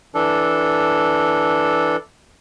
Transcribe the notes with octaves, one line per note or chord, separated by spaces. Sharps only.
E3 D4 A4